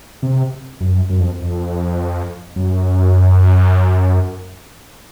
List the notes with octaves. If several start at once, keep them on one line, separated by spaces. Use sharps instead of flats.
C3
F#2
F#2
F2
F2
F#2